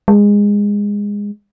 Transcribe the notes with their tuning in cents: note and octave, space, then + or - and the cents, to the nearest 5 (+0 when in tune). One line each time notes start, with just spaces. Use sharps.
G#3 -20